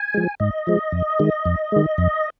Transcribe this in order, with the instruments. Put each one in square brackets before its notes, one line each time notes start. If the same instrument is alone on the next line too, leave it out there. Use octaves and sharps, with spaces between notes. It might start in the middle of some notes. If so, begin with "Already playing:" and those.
Already playing: [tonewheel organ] G#5
F3 G#3
G#2 D#5
F3 G#3
F2
D#3 G#3
F2
D#3 G#3
F2